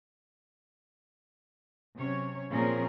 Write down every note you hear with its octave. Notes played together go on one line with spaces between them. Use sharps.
C3 F#3 C#4 C#5
A#2 F3 C4 C#4 G#4 A#4